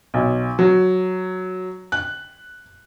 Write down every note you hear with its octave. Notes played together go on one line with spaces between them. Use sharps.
B1
F#3
F#6